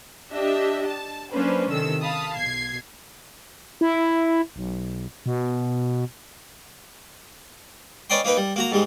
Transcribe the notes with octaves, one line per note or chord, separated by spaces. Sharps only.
D4 G4 D#5 E5
A5
F#3 A#3 C#4 D4 B4 C5
C3 D#3 A4 E6
F5 A5 B5 D#6
B1 G#6 C7
E4
B1
B2
C#4 B4 D5 D#5 G5 C6
A#3 D#4 B4 G5
G3
A#3 F#4 A#5
G#2 G3 G#3